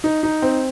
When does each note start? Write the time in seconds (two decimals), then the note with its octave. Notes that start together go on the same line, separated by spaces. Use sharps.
0.04 D#4
0.23 D#4
0.42 C4